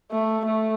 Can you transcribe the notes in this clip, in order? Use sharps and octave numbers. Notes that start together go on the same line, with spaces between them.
A3
A3